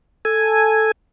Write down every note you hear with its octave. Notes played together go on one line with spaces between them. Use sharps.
A4 G#5